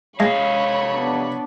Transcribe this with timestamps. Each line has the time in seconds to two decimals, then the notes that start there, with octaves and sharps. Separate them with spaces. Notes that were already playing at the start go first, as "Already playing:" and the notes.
0.20 C3 G#3 C#5 D#5 F5 B5
0.92 B3 D4